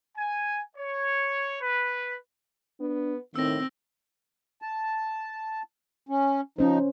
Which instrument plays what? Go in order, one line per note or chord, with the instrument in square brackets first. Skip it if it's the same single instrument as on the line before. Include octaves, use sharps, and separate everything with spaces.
[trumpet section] G#5
C#5
B4
[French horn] B3 [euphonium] D4
[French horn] A2 [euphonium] D#3 [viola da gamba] C4 [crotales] E6 A#6
[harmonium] A5
C#4
[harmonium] F3 D#4 [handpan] C#4 C5